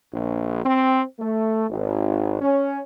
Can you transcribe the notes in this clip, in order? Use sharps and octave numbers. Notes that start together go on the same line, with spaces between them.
A#1
C4
A3
G#1
C#4